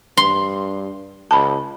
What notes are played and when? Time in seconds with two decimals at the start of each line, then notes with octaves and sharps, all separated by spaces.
0.17 G2 C6
1.31 C#2 A5 B5